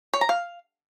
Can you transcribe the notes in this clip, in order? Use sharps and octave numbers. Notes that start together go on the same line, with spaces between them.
C#5
A#5
F5